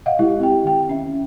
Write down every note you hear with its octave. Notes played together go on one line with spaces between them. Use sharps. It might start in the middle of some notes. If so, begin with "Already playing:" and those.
D#5 F5 F#5
G#3 E4 G4
C4 G4 G5
D#3 G5
C#4 E5